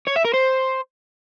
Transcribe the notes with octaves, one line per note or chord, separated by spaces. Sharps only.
C#5
E5
A#4
C5